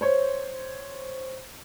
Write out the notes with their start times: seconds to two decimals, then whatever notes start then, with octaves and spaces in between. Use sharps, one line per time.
0.01 C5 C#5